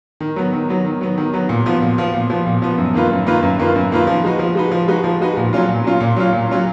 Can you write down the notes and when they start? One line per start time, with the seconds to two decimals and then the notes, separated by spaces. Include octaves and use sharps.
0.20 D#3
0.36 F#3 B3
0.53 D#3
0.69 F#3 B3
0.84 D#3
1.01 F#3 B3
1.18 D#3
1.33 F#3 B3
1.49 A#2
1.66 F3 B3
1.82 A#2
1.98 F3 B3
2.14 A#2
2.30 F3 B3
2.46 A#2
2.62 F3 B3
2.78 F#2
2.94 D#3 A#3 F4 B4
3.11 F#2
3.27 D#3 A#3 F4 B4
3.42 F#2
3.59 D#3 A#3 F4 B4
3.76 F#2
3.91 D#3 A#3 F4 B4
4.07 F3
4.24 G#3 D#4 F#4 B4
4.39 F3
4.55 G#3 D#4 F#4 B4
4.71 F3
4.88 G#3 D#4 F#4 B4
5.04 F3
5.21 G#3 D#4 F#4 B4
5.37 A#2
5.53 F#3 C#4 F4
5.69 A#2
5.84 F#3 C#4 F4
6.00 A#2
6.17 F#3 C#4 F4
6.33 A#2
6.49 F#3 C#4 F4